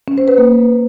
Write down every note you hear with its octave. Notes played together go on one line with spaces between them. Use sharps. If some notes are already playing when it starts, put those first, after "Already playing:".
C#4
C5
B4
A#3